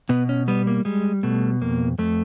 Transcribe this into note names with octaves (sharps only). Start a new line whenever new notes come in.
B2 B3
C#4
G3 B3
A#3
G3 G#3
B2 A3
F2 A#3
F2 A3